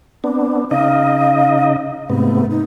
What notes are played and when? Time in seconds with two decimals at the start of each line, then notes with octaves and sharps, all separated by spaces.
0.24 B3 C4 D4
0.71 C#3 D#4 D#5 F5
2.10 G#2 C3 A3 B3
2.50 D#4